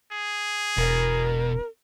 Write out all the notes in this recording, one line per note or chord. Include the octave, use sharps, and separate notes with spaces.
G#4
E1 B2 A#4